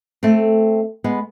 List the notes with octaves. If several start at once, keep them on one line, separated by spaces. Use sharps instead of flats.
A3 C4
G#3 B3